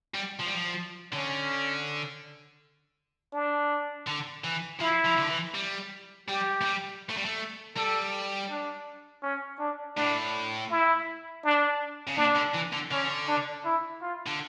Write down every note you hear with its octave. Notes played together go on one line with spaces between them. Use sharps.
G3
F3
G3
F3
D3 C#4
D4
D3
E3
F3 E4
F3
D3
E3
G3
G3 G4
A3
G3
A3
G3
A3
G3 A4
D4
C#4
D4
A2 D4
E4
D4
C#3
A#2 D4
D3
E3
D3
D3 C#4
D4
E4
F4
D3